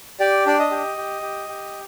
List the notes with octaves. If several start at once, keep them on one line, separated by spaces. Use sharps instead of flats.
G4 D5
D4 D5
D#5
G4
G4
G4
G4